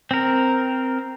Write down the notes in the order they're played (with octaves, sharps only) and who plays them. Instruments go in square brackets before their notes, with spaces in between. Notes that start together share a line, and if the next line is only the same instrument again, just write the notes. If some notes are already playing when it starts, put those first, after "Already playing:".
[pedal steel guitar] C4 A#4